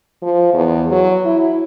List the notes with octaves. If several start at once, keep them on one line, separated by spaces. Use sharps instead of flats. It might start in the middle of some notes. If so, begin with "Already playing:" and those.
F3
E2
F#3
E4